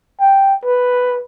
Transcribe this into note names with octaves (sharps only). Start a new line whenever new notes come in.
G5
B4